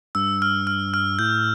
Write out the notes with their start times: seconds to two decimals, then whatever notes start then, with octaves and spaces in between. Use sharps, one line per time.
0.15 G2 E6
0.42 F6
0.67 F6
0.94 F6
1.19 A2 G6